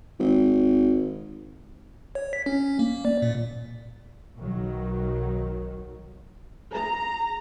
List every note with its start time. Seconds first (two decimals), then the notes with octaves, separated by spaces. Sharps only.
0.19 G#1
2.15 C#5
2.33 B6
2.46 C#4
2.79 A#3
3.05 D5
3.22 A#2
4.39 B1 D#3 F#3
6.73 G#4 A#5